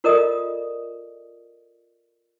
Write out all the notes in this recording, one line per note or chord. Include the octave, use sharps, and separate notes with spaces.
F4 A4 A#4 D5 D#5 D#6